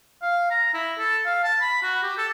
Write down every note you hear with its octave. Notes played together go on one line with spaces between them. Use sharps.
F5
A#5
E4
A4
F5
A5
B5
F#4
G4
A4